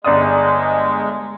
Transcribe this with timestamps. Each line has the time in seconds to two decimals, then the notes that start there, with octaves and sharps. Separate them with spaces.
0.04 G1 G#3 D5 D#6